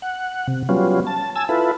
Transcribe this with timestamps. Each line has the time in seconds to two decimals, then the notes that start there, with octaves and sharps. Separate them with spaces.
0.02 F#5
0.47 C3
0.69 F#3 G3 B3 C#4 F4
1.07 A5
1.35 G#5 A5 E6
1.49 E4 F4 A4 B4